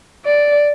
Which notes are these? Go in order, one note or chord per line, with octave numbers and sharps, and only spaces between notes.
D5